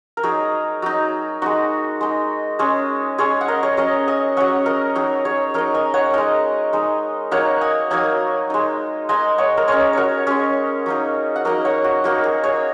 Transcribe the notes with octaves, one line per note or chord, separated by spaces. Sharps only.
A#4
F#3 D#4 G#4
F#3 D#4
G#3 D#4 F#4
G#3 D#4
G#3 C#4 G#4
G#3 C#4 G#4 C#5
F#5
A#4 D#5
G#4 C#5
F#3 C#4 A#4 D#5
D#5 G#5
F#3 C#4 C#5 F#5
A#4 D#5
F#3 D#4 G#4
G#4 C#5
F#3 D#4 A#4 D#5
D#5 G#5
C#5 F#5
G#3 D#4 A#4 D#5
G#3 D#4
F#3 A#3 D#4 C#5 F#5
D#5 G#5
F#3 A#3 D#4 D#5 G#5
G#3 D#4
G#3 D#4 D#5 G#5
C#5 F#5
A#4
G#3 C#4 G#4 C#5
F#4 A#4 C#5
G#3 C#4 G#4 C#5
F#3 A#3 D#4
F#5
F#3 A#3 D#4 A#4 D#5
C#5 F#5
F#4
F#3 A#3 D#4 F#4
G#4
G#4 C#5